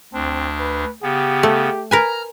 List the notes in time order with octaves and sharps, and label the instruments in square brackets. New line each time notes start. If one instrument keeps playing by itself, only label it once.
[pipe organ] D2 D4 [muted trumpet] C4
[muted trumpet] B4
[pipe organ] C#3 B3 [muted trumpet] G4
[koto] A3
[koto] A#4 B4 G#5 [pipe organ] A#5 F6